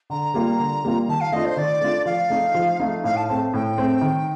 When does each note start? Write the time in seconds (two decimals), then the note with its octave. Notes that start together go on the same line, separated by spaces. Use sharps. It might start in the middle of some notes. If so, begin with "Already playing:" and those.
0.10 D3 A#5
0.34 G3 A#3 F4
0.59 D3
0.84 G3 A#3 F4
1.08 D#3 A5
1.20 F5
1.32 A3 D4 F4 D#5
1.45 C5
1.56 D#3 D5
1.81 A3 D4 F4
2.05 F3 F5
2.30 A3 D#4
2.54 F3
2.80 A3 D#4
3.04 A2 F5
3.16 A5
3.28 A3 C4 A5
3.53 A2 G5
3.78 A3 C4
4.01 D#3